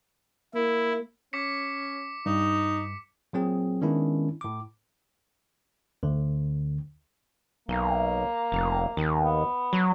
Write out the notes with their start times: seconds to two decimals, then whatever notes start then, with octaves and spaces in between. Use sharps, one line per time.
0.54 A#3 E4
1.33 C#4 D6 B6 C#7
2.26 G2 D#4
3.33 A#2 F#3 C4 G#4
3.82 D#3 G#3 B3 C#4 D4 E4
4.41 A2 D6
6.03 D2 D3
7.69 B1 A#3
8.52 F1
8.97 D#2
9.20 B3
9.73 F#3